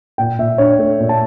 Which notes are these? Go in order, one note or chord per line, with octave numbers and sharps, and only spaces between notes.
A#2 G5
A#2 E5
D4 C#5
A3
A#2
A5